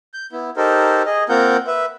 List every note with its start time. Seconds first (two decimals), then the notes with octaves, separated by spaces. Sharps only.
0.14 G6
0.32 B3 E4
0.57 D#4 G4 A4 A#4 C5
1.06 G#4 D#5
1.29 A#3 C4 F4 A#4 F#5 G6
1.67 B4 E5